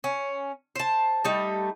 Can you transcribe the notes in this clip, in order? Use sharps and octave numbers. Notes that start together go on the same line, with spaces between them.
C#4
C5 A5
G3 A3 D#4